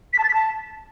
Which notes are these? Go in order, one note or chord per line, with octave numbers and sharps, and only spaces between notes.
B6
A5
A6
B6
A5